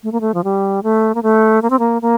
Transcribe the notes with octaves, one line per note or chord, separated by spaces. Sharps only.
A3
A#3
A3
F3
G3
A3
A#3
A3
A#3
C4
A#3
A#3